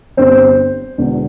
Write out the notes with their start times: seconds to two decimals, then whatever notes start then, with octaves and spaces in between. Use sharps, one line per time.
0.17 G1 G2 D3 G3 C4 C5
0.98 E1 E2 D3